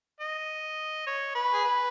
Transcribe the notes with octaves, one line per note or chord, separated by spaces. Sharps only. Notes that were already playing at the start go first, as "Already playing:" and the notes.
D#5
C#5
B4
G#4
B4